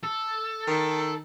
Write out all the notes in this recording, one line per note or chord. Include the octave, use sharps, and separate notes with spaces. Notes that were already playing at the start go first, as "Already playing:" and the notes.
A4
D#3